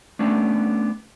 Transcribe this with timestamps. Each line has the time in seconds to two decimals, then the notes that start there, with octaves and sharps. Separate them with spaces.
0.19 A3 B3 C#4 D4